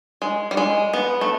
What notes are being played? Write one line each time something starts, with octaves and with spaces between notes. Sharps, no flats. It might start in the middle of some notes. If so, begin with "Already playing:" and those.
G#3
G3
G#3
B3
A3